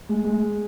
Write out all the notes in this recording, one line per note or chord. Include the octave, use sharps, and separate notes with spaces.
G#3
G#3